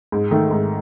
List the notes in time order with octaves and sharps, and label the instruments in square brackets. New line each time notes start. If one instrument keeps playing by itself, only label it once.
[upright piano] G#2
D#3 A3
G#2